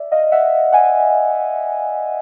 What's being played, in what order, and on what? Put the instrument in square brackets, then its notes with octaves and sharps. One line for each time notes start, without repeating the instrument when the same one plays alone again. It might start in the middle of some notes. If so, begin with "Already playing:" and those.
Already playing: [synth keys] D5 E5
D#5 F5
E5 F#5
F#5 G#5